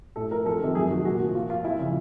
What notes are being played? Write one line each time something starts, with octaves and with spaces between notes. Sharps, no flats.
A2 A4
F3 A#4
F2 A4
C3 D#3
F#2 G#4
D#3 F#4
A#2 F#4
F3
A#2 F4
F3 F4
F2 E4
C#3 F3